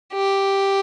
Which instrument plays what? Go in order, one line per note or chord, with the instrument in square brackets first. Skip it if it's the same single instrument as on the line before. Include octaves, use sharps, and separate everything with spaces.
[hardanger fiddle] G4